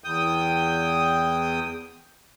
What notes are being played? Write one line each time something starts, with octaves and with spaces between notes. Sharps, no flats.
E2 G5 D#6